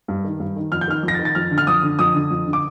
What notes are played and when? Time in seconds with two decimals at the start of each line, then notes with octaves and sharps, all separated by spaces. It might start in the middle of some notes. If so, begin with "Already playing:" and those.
0.08 G2
0.24 D#3
0.40 G2
0.56 D#3
0.72 F2 F6
0.81 G6
0.88 D#3 F6
1.03 F2
1.08 A#6
1.14 A6
1.19 D#3
1.25 A6
1.35 F2 F6
1.51 D3
1.58 F6
1.67 F2 D#6
1.83 D3
1.99 F2 D#6
2.14 D3
2.30 F2
2.47 D3
2.53 D6